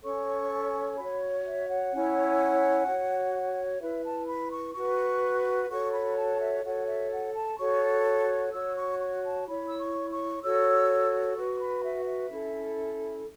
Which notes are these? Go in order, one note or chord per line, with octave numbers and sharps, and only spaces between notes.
C#4 A4 C#5 C#6
F#4 C#5 B5
E5
F#5
C#4 E4 C#5
F#4 C#5
E4 B4 E5
A5
B5
C#6
F#4 B4 C#6
F#4 A4 C#5 C#6
B5
A5
E5
F#4 A4 C#5 F#5
E5
F#5
A5
F#4 A4 C#5 C#6
F#4 C#5 E6
C#6
C#6
A5
E4 C#5 B5
E6
C#6
C#6
F#4 A4 C#5 E6
F#4 B4 C#6
B5
E5
E5
C#4 E4 A4